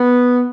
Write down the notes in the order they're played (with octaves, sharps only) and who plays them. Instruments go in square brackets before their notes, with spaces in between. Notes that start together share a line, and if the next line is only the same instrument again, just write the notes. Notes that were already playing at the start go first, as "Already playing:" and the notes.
Already playing: [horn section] B3